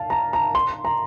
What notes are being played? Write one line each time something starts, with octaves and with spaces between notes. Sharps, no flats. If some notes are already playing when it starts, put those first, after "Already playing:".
Already playing: F5 A5
A#5
A#5
C6
A#5